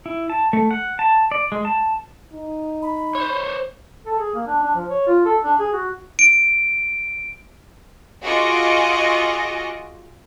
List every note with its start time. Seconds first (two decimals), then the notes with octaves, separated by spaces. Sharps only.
0.06 E4
0.30 A5
0.53 A3
0.71 F#5
0.99 A5
1.31 D5
1.52 G#3
1.65 A5
2.33 D#4
2.82 B5
3.15 C5 C#5
4.06 A4
4.19 G#4
4.35 A#3
4.47 D4
4.63 D4
4.75 F3
4.90 C#5
5.07 F4
5.26 A4
5.44 D4
5.59 G#4
5.73 F#4
6.19 D7
8.24 F4 F#4 G#4 D#5 C#6 D6